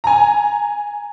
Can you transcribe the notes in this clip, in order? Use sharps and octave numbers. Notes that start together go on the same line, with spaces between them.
G#5 A#5